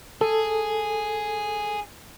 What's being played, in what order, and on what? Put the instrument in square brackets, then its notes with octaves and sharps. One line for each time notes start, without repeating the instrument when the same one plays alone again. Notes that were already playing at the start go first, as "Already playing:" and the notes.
[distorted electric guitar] G#4 [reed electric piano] A4